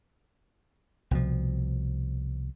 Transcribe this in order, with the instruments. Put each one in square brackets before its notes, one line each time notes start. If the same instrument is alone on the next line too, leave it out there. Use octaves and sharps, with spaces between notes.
[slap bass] C2 B2 F3